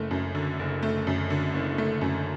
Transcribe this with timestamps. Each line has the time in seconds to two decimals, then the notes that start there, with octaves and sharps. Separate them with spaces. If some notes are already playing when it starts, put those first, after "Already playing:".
Already playing: F#1 A3
0.11 F#2
0.35 D3
0.59 F#1
0.82 A3
1.07 F#2
1.30 D3
1.54 F#1
1.78 A3
2.01 F#2